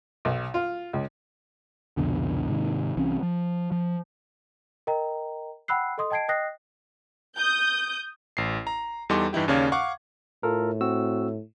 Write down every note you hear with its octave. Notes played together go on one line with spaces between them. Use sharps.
B1
F4
C#2
C2 F2 B2 D3
G#2 C3 D#3
C2 E3 C4 C#4
F3
F3
A#4 D#5 G5 A#5
F#5 G5 B5 E6 F#6 C7
A4 D#5 C6 D#6
D#5 G5 A5 G#6 C7 D7
D#5 G5 D#6 F#6 A#6 C7
D#6 G6
A1 C7
A#5
E2 G3 D#4 A4 C6 D6
G2 E3 D#4 E4 G4
D#2 C#3 C#4 D5 F5 G#6
F5 F#5 C#6 D6
A2 F4 A4 A#4
C4 F#4 E6